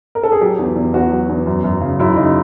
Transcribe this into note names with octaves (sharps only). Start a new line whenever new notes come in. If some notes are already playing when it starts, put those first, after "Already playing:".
A#4
A4
G#4
F#3 G4
E2
E2
E2 F#4
F#3
E2
F#2
F#2
C#3
F#2 E4
C#3 D#4